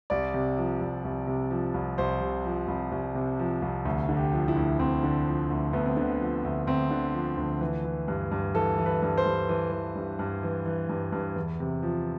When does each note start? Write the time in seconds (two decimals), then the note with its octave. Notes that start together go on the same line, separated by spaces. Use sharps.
0.10 C2 D5
0.34 C3
0.58 F3
0.81 C2
1.05 C2
1.27 C3
1.51 F3
1.74 C2
1.98 C2 C5
2.21 C3
2.45 F3
2.68 C2
2.92 C2
3.15 C3
3.39 F3
3.62 C2
3.85 D2
4.09 D3
4.17 G4
4.33 F3
4.48 E4
4.56 D2
4.79 D2 C4
5.04 D3
5.26 F3
5.50 D2
5.73 D2 B3
5.85 C4
5.97 D3 B3
6.20 F3
6.44 D2
6.67 D2 C4
6.91 D3
7.14 F3
7.37 D2
7.61 E3
7.84 E3
8.08 G2
8.31 G2
8.54 E3 A4
8.78 E3
8.86 B4
9.02 G2
9.18 C5
9.26 G2
9.49 E3
9.72 E3
9.96 G2
10.19 G2
10.43 E3
10.65 E3
10.89 G2
11.12 G2
11.36 E2
11.60 C3
11.83 F3